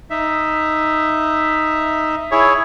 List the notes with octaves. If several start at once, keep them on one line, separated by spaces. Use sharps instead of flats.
D#4 E5
E4 G#4 C#5